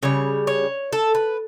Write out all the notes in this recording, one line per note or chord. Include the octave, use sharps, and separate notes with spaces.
C#3 G3 C#5
C#5
A4
B4